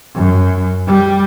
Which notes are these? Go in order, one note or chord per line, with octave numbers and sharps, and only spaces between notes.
F#2
G3